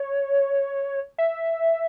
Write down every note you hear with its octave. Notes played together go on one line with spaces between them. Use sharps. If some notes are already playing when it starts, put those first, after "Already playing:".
Already playing: C#5
E5